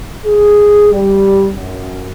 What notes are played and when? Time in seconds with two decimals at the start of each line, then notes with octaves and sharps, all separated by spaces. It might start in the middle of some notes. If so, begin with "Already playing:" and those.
0.24 G#4
0.90 G3
1.53 F#2